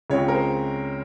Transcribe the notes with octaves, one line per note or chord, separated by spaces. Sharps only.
C#2 C#3 G#3 C4 C#5
A#4
C5